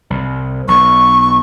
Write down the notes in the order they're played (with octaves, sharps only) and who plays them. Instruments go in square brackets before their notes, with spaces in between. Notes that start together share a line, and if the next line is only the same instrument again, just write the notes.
[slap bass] C2
[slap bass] B1 [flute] C#6